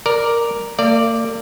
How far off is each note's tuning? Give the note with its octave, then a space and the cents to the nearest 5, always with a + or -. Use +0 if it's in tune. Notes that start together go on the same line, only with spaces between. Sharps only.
A#4 +0 D5 +0
A#3 -40 D5 +0